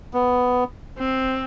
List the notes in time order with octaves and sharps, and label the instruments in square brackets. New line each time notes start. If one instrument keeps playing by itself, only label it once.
[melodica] B3
[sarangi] C4